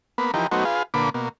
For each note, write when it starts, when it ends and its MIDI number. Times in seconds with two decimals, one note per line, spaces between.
0.18 0.31 58
0.18 0.31 59
0.18 0.31 83
0.34 0.47 52
0.34 0.47 53
0.34 0.47 63
0.34 0.47 67
0.34 0.47 70
0.51 0.64 54
0.51 0.64 57
0.51 0.64 59
0.51 0.64 63
0.51 0.64 66
0.51 0.64 72
0.65 0.83 65
0.65 0.83 68
0.65 0.83 71
0.65 0.83 77
0.94 1.10 46
0.94 1.10 50
0.94 1.10 58
0.94 1.10 71
0.94 1.10 83
0.94 1.10 86
1.14 1.29 47
1.14 1.29 58